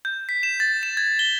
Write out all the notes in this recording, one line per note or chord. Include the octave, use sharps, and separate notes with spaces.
G6
B6
E7
A6
E7
G#6
G7